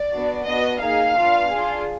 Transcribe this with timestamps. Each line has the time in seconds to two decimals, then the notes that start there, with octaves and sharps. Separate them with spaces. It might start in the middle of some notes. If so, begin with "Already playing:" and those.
Already playing: D5
0.13 B3 D4 F#4
0.47 B3 D4 F#4 D#5
0.81 A#3 D#4 G#4 F5
1.16 B3 D4 F4
1.51 D4 F4 G#4